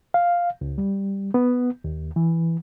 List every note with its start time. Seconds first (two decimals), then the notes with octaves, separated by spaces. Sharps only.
0.14 F5
0.61 C#2
0.78 G3
1.34 B3
1.84 D#2
2.16 E3